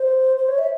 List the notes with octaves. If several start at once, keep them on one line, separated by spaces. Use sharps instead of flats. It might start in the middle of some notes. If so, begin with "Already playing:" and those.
Already playing: C5
C5
C#5
E5